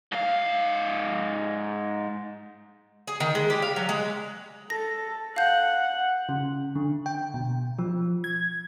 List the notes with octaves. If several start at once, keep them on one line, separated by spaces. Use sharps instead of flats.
G#2 F5
G#4
D#3
G#3
G4
F5
F#3
G#3
A4 A#6
F5 F#5 G6
C#3
D3
G5
B2
F3
G#6